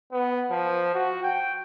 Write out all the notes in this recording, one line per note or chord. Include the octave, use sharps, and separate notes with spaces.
B3
F3
F#4
G5